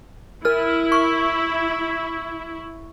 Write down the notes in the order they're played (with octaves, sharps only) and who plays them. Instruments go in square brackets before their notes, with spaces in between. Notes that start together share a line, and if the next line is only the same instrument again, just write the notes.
[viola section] E4 [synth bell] A#4 F6
[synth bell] C#6